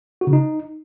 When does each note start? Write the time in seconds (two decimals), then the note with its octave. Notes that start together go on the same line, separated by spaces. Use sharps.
0.21 F#4
0.27 C#3
0.33 D#4